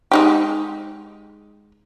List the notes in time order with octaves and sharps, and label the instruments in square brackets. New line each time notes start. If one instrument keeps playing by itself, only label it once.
[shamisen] G#3 D#4 G4